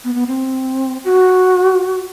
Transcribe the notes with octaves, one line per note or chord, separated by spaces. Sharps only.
B3
B3
C4
F#4